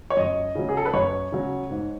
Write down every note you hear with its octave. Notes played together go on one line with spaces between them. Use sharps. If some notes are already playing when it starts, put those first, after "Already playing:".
C#5
F#2 D#5
C#3 F#3
G#4
A4
B4
F#2 C#5
C#3 F#3
G#2